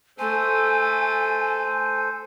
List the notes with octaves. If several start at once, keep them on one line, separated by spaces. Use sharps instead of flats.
A3 A4 C5 G#5